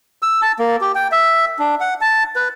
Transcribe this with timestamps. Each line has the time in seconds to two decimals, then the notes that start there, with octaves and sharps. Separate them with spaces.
0.22 E6
0.42 A5
0.59 A#3
0.81 G4
0.95 G5
1.12 E5
1.59 D4
1.80 F#5
2.01 A5
2.36 B4